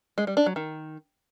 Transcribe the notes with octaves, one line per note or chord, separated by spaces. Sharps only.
G#3
G3
D4
F#3
D#3